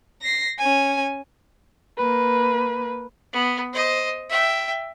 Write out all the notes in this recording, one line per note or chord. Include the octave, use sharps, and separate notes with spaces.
A#6 C7
C#4 G#5
A#3 B4
B3
C5 D#5
E5 G5